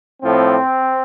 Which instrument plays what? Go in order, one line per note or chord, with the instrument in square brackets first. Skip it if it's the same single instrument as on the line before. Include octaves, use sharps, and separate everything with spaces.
[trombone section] A2 F3 C4